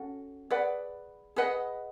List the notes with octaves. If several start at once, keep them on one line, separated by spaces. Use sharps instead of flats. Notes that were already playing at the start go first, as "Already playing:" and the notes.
Already playing: C#4 F#4 A4
G#4 B4 D5 F#5
G#4 B4 D#5 F#5